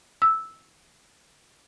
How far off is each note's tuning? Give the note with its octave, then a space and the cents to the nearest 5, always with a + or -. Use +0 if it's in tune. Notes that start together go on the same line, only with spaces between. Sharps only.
E6 -5